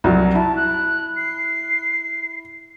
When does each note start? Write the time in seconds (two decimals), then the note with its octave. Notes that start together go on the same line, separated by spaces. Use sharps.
0.04 C2 F#3
0.35 E4 A5
0.56 F#6
1.17 C7